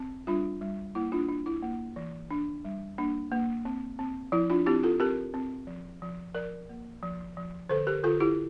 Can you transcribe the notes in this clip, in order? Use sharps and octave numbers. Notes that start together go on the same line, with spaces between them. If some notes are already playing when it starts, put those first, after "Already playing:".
Already playing: C4
G3 D4 F4
G3
A#3 E4
D4 F4
D4
E4
A#3
E3
D4
G3
A#3 D4
A#3
C4
C4
F3 E4
D4 F4
C4 E4 G4
F4 A4
C4 G4 A#4
C4
F3
F3
F3 A#4 D5
A#3
F3
F3
D3 A4 C5
G4 A#4
D3 F4 A4
E4 G4